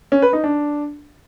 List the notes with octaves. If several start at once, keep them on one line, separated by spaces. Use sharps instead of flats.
C#4
B4
D#4
D4